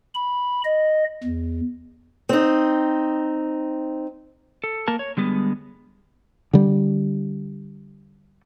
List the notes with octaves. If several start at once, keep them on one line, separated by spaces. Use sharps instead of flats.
B5
D#5
E2
C4 D#4
A4
A#3 A#4 A5
C#5
D3 G3 G#3 B3
D3 G3